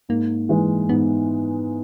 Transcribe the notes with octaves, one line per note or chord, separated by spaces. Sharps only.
G#2 A#3
E3 G#3
G#2 B3